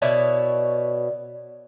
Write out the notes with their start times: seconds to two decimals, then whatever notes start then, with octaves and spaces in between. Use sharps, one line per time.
0.02 B2 E4 C#5 D5